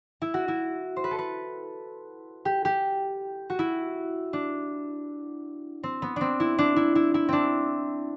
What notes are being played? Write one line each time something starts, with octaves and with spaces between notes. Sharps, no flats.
E4
F#4
E4
C5
B4
A4
B4
G4
G4
F#4
E4
D4
C4
B3
C4 D4
E4
D4
E4
E4
E4
C4 D4